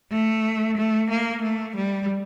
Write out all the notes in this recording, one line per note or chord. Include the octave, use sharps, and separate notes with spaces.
A3
A3
A#3
A3
G3